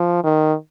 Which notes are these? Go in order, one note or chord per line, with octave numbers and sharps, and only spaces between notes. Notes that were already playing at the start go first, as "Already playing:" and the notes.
Already playing: F3
D#3